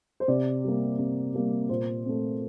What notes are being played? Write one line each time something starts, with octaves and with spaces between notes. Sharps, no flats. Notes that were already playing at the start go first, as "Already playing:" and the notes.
C5
C3 D5
G3 A#3
C3
G3 A#3
A#2 C5
A3 C4